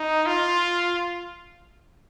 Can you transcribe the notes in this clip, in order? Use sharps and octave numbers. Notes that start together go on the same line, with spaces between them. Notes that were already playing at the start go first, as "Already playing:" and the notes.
Already playing: D#4
F4